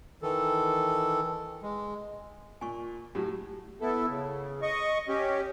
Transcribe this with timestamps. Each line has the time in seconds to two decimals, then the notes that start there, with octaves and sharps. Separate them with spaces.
0.22 D#3 E3 A4
1.62 G#3
2.61 A#2 G#5 C#6
3.15 A2 F#3 G4
3.80 B3 E4 A4
4.09 C#3
4.62 D#5 C#6
5.09 C#4 G4